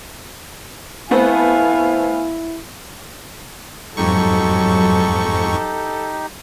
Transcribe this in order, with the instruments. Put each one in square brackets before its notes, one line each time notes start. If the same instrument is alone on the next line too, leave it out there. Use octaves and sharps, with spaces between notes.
[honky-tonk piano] A3 B3 C4 [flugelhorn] E4 [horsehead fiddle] F5 G#5
[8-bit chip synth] F2 G#2 C#6 [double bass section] F#3 [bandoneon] D#4 G4 [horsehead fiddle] A4